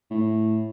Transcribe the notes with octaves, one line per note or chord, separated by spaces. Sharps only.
A2